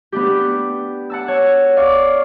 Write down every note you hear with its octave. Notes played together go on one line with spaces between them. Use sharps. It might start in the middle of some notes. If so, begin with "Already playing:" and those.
B3 D4 G4
F#5 A5 E6
C#5
D5 F5 C#6